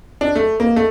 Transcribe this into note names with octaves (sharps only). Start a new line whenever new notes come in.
D4
A3
A#3
A3